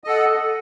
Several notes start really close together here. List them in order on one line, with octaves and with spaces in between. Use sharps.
D#5 A4 F#5